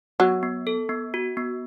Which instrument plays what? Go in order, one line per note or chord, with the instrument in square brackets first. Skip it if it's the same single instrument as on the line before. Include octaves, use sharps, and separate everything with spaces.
[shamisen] F#3 [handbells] B3
[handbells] B3
A4
B3
F#4
B3